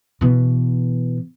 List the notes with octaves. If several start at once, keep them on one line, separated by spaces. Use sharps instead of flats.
B2 E3